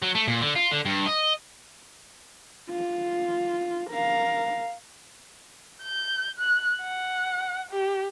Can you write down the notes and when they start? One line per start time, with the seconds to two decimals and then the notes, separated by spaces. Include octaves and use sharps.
0.02 F#3
0.15 A3
0.28 A#2
0.41 D3
0.56 F4
0.72 D3
0.85 G2
1.06 D#5
2.70 F4
3.91 A#4 F5
5.83 G6
6.39 F#6
6.81 F#5
7.71 G4